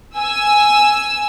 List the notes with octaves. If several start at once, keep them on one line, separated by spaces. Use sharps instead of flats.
G#5 E6